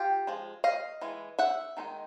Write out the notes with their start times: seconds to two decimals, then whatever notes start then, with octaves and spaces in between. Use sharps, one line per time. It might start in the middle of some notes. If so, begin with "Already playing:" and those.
Already playing: F4 G4
0.27 F3 G#3
0.64 D#5 F5
1.01 E3 G#3
1.39 E5 F#5
1.77 D#3 G#3 C4 D#4